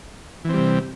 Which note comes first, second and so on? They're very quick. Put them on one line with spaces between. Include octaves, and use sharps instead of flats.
E3 C4 G3 C3